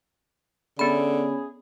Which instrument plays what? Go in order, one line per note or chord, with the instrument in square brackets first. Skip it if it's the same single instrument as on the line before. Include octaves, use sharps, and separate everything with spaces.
[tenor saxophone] D3 [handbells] B3 B5 [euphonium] C#4 [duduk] G#4